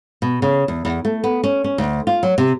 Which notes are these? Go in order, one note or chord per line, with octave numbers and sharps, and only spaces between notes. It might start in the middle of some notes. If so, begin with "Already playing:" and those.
B2
C#3
E2
E2
A3
B3
C#4
C#4
D2
F4
F#3
C3